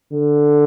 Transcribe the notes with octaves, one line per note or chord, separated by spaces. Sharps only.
D3